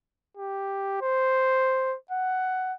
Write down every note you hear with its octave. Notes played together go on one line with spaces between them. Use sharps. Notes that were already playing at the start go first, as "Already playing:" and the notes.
G4
C5
F#5